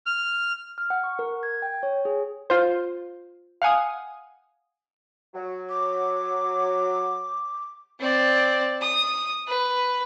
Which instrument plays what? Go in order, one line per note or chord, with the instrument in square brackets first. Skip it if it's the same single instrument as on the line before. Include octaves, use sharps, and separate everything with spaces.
[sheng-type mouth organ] F6
[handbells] F6
F#5
C#6
A#4
G#6
G5
C#5
G#4
[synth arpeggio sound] F4 C5
F5 F#5 G#5 D#6
[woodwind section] F#3
[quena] D6
[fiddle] C4 D5
D#6
B4